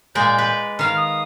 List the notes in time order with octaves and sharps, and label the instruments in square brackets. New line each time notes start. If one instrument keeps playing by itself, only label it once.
[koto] A#2 G#3 D5 [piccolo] G6
[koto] B4
[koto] D#3 F5 [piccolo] F6
[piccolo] D#6